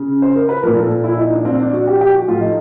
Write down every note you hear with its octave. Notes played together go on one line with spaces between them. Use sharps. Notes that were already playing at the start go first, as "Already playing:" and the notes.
Already playing: C#3
C5
A#4
B4
A#2 F3 A#4
A4
E4
D#4
D4
C4
D4
F#4
G4
G4
F#4
A2 F3 F4
D#4